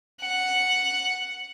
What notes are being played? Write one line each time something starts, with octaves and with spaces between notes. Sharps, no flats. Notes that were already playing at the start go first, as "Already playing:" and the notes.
F#5